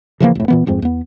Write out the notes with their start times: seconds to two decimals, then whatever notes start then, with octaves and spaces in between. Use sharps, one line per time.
0.20 C#3 E3 F3 A#3
0.35 F1 A2
0.48 A#2 E3 B3
0.66 D#1 F2 G#2 C4
0.82 E2 B3